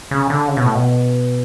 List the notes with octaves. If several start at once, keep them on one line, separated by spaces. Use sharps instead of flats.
C#3
D3
C#3
B2
A2
B2